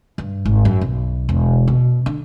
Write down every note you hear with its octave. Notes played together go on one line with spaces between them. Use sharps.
G2
G#1
F#2
B1
E1
B2
D3